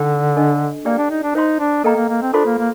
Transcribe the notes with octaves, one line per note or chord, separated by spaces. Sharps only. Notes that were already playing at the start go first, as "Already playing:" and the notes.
Already playing: D3 D#4 A4 D5 G5
D4 A4 D#5
A#3 G4 D5 G5
D4
D#4
D4
D#4 C5 F5 C6
D4
A#3 A4 D#5 G5 A#5
A#3
A#3
C4
D4 F4 A4 C5 F5 C6
A#3
A#3